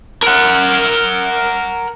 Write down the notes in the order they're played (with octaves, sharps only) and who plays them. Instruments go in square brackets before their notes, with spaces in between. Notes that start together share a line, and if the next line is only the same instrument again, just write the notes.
[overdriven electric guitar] A#4 F#5